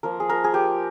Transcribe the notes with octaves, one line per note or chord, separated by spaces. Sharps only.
F3 A#3 F4 A#4
G#4
A#4
G#4
G4